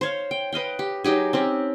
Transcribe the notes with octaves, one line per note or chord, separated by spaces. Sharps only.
C5 C#5 F5
G5
B4 D#5 F5 G5
G4
F#3 D#4 G4 G#4
C4 C#4 G4